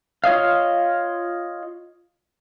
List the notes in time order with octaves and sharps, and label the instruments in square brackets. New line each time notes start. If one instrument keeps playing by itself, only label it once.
[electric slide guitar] F4 C#5 D#5 F5